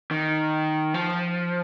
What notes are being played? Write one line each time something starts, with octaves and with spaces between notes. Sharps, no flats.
D#3
F3